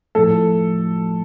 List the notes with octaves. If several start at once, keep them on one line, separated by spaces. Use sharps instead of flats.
A2 F3 A3 A4